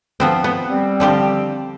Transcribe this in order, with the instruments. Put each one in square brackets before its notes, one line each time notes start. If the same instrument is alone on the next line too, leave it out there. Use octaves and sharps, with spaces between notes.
[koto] F3 B3 C4
B3
[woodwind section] G3 C4
[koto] D3 F3 G4